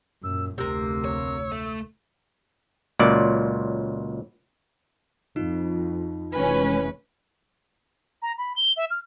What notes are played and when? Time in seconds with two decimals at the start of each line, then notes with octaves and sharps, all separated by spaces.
0.23 F#2 A#2 E6
0.58 F1 D2 C3 A#3 E6
1.05 C#5
1.52 A3
2.99 C#2 A#2 F#3 D5
5.36 F2 D#4 F4
6.33 F1 E3 G#3 C#4 B4 G#5
8.22 A#5
8.38 B5
8.56 G7
8.77 E5
8.91 F6